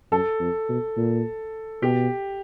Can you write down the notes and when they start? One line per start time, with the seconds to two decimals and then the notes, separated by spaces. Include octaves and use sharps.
0.11 F#2 A4
0.40 F2
0.69 B2
0.97 A#2
1.82 B2 G4